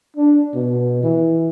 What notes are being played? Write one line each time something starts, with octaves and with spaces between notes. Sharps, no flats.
D4
B2
E3